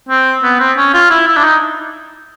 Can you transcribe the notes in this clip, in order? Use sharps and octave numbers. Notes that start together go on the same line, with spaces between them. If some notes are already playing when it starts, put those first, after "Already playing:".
C4
B3
C4
C#4
F4
E4
E4
D4
D#4